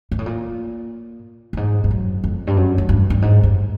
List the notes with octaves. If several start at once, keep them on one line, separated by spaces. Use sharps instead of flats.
G#2
A2
A#2
G2
G#2
G2
F#2
F2
G2
F#2
F#2
G2
G2
G#2
G2